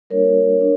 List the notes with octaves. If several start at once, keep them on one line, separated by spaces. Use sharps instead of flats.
G3 A#3 D4 F#4 A#4 C#5
B3 D4